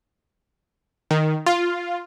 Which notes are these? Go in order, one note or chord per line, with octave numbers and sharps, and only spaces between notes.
D#3
F4